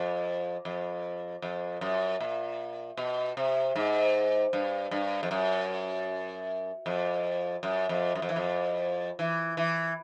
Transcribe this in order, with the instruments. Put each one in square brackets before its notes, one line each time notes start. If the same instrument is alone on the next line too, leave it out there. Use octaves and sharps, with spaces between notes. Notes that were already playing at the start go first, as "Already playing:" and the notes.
Already playing: [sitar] F2
F2
F2
F#2
A#2
B2
C3
G#2
G2
G2
F2
F#2
F2
F#2
F2
F#2
F2
E3
F2
E3
E3